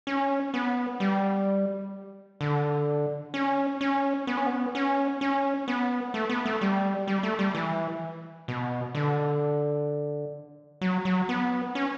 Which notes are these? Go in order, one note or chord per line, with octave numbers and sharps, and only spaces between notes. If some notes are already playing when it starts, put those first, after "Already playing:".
C#4
B3
G3
D3
C#4
C#4
B3
C#4
B3
C#4
C#4
B3
A3
B3
A3
G3
G3
A3
G3
E3
B2
D3
F#3
F#3
B3
C#4